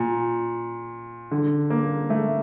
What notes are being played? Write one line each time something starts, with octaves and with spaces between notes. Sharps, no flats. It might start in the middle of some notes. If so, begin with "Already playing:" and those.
Already playing: A#2
D3
A#3
A3